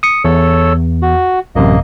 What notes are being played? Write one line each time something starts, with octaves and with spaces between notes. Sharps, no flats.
D#6 C#7
E2 A4 C#5 E6
F#4
A1 F#2 C3 A#3 D#5